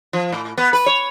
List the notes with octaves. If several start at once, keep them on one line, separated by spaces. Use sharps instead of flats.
F3
A2
B3
B4
C#5